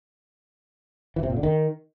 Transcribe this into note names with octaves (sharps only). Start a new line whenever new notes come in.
E3
C3
A#2
D3
D#3